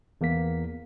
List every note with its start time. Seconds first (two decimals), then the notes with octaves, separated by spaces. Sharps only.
0.21 E2 A#3 B6